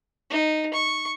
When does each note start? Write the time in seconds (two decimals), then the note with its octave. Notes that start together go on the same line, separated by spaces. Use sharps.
0.30 D#4
0.74 C#6